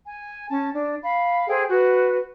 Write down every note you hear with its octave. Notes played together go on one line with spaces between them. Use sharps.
G#5
C#4 A5
D4
F5 B5
G#4 A4 C5 G5
F#4 B4